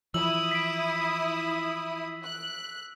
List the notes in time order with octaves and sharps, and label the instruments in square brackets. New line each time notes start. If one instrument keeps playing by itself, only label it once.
[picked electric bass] E3 F3 [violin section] E4 D#6 [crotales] E6 F#7
[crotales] B6 D7
[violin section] F#6